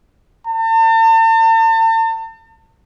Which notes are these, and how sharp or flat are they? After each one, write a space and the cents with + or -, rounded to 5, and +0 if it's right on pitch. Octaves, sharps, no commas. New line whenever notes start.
A5 +40